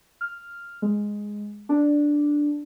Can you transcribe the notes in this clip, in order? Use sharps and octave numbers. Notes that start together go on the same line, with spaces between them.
F6
G#3
D4